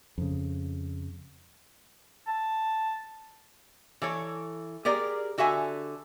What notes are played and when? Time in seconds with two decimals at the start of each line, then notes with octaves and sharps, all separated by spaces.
0.18 F2 C#3
2.27 A5
4.02 E3 A4 C#5
4.85 G4 G#4 A#4 D5
5.38 D3 F#4 A4 E5 G#5